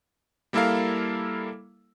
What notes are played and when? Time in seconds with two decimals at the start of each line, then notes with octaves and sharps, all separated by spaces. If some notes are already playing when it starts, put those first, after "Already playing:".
0.53 G3 A#3 E4 A4 A#4 F5